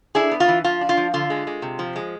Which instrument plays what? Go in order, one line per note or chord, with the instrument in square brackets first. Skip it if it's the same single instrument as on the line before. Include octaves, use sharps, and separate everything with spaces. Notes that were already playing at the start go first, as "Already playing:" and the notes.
[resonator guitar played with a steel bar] D4 E4 G#4
B3
F4
E3
F3 F4
D4
F4
F3
D3 F4
G#3
G#3
C3
F3
G#3